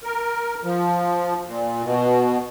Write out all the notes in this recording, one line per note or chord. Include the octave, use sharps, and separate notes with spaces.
A#4
F3
A#2
B2